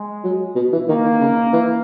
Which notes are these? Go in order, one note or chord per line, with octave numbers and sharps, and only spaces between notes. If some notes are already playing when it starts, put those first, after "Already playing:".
Already playing: G#3
F#3
B2
E3
D#3 A#3
D#3
C#3
E3